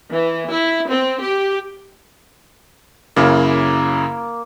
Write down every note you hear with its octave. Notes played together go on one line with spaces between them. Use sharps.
E3
E4
C4
G4
F#2 C#3 A#3 E4